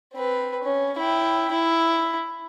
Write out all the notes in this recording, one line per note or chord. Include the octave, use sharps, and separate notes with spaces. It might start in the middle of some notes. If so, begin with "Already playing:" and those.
C4 B4
C#4
E4 G5
E4